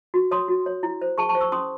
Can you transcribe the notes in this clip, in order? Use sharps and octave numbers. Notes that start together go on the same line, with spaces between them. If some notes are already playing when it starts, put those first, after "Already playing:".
F#4
C#5 C6 D#6
F#4
C#5
E4
C5
G#4 A5 C#6
A5 C#6
C5
C#6 E6
C#4 C6 D#6